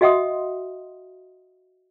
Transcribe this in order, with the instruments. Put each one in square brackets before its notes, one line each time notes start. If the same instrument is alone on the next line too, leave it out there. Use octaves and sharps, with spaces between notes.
[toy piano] F#4 D#5 E5 F#5 C6 D#6